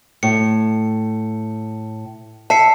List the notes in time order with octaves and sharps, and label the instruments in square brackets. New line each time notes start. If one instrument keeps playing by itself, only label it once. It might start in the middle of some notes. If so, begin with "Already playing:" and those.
[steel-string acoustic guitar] A2 [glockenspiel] C#7
[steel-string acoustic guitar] E5 [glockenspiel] A5 C7 C#7